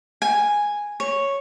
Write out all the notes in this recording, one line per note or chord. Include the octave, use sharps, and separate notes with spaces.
G#5
C#5